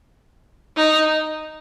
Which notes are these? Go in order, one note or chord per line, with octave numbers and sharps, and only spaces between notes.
D#4